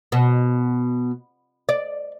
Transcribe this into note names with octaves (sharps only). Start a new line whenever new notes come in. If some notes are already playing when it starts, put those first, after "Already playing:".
B2
D5